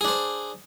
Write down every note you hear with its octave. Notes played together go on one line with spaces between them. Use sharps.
D4 G#4 C5